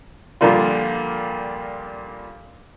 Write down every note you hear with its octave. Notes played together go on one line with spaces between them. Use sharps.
A#2 D3 F3 G3 A#3 F4